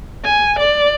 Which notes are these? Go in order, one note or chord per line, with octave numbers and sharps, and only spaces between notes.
G#5
D5